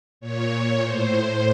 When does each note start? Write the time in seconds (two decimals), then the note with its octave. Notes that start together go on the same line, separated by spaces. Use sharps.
0.21 A#2 C#5
0.50 C#5
0.81 A2 C5